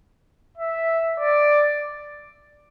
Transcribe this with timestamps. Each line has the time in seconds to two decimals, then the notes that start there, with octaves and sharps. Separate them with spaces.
0.57 E5
1.20 D5